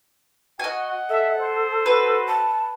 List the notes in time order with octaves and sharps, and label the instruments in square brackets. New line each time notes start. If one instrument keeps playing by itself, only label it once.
[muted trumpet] F#4 [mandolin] D#5 G#5 [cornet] F#5
[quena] A4 [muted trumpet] E5
[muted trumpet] C5
[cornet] F#4 [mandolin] B4
[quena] A5